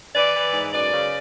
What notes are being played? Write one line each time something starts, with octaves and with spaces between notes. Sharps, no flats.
E3 B4 D5
E3
G#2
F#2 B4 D5
C#3